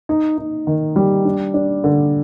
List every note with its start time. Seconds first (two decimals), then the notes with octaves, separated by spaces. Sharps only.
0.09 D#4
0.38 D#4
0.67 D#3
0.96 G3
1.25 D4
1.54 D4
1.84 D3